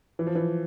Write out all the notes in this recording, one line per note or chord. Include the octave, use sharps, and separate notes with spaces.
E3
F3
E3